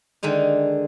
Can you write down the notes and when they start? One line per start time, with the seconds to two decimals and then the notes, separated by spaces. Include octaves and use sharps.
0.23 D3 D#3 G#3 D#4